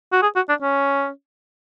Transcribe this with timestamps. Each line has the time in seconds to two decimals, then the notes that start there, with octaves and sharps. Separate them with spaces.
0.12 F#4
0.22 G#4
0.36 F#4
0.49 D4
0.62 C#4